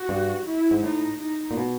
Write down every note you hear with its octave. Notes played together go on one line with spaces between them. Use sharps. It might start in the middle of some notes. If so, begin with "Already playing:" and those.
Already playing: F#4
G2
E4
G#2
A2 D#4
D#4
A#2
B2